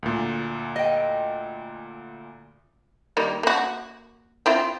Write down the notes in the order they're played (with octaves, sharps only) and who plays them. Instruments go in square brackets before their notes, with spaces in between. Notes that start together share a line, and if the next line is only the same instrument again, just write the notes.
[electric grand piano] D2 A#2
[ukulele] D#5 G5
[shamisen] D#3 G3 A#3
A#3 F#4
C4 E4 F4